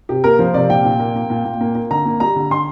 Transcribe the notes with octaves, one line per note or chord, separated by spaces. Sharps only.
C3 G4
A#3 A#4
F3 C5
C3 D5
A#2 G5
A#2
A#3
A#3
A#2
A#2
A#3
A#3
D3 A#5
A#3
G3 A#5
D3
D3 C6